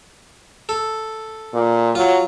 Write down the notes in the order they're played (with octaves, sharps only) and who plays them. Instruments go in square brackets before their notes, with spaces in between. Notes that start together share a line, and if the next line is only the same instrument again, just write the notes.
[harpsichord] A4
[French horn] A#2
[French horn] F#3 [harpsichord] F4